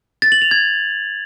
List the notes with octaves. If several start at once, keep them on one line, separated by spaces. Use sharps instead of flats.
A6
F#7
F7
G#6